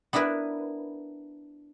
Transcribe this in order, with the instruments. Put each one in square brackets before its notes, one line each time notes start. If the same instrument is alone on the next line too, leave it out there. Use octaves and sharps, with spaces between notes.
[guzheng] B3 D4 E4 A#4 B4